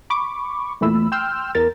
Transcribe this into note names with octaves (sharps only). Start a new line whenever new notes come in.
B5 C#6 D6
E2 A#2 E3 A3 B5 E6
G5 C6 E6 F6 G6
E2 A#4 A6